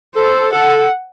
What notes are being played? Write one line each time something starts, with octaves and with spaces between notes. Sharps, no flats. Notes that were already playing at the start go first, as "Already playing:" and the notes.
A4 C5
A4 F#5